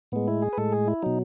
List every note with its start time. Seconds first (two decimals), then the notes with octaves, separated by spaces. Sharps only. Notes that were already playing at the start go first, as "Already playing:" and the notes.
0.12 A2 G#3 B3
0.28 E4
0.42 G#4
0.53 B4
0.58 A2 G#3 A4
0.72 G#4
0.88 E4
1.02 B2 F#3 D#4